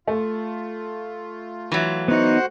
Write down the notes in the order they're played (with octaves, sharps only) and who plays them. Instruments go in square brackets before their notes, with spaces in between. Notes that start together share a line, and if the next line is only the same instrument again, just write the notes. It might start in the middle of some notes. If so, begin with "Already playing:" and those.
[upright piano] A3 [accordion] F4
[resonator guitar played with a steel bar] E3 F#3
[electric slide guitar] B3 D#4 [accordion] F#4 C5 F#5